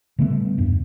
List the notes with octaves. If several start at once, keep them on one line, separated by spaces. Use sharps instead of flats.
C#3 G3 A3 B3
E2 G2